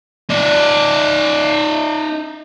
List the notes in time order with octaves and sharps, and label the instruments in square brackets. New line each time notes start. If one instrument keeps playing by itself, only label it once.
[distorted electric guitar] D#4 D5